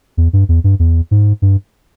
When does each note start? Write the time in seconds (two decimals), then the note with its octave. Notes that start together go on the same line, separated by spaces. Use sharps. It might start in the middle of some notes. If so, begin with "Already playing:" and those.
0.17 E2
0.33 G2
0.49 E2
0.64 G2
0.79 E2
1.11 G#2
1.42 G2